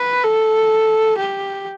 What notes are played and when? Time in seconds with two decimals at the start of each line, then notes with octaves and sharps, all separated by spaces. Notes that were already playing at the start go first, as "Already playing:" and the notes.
Already playing: B4
0.24 A4
1.18 G4